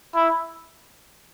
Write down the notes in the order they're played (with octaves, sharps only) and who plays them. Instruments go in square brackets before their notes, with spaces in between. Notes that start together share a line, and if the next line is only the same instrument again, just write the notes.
[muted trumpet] E4